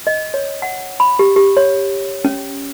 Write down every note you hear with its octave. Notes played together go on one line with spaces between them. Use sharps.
D#5
C#5
F#5
B5
G4
G4
C#5
C#4